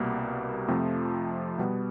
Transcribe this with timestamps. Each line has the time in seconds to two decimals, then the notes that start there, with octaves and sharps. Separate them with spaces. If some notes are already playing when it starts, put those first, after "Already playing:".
Already playing: C2 B2 G3 A#3
0.68 F2 C3 F3 A3
1.58 B2 G3 B3